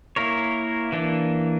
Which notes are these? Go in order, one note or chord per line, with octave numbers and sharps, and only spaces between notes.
A#3 E4 A#4 C#5
E3 A#3 D4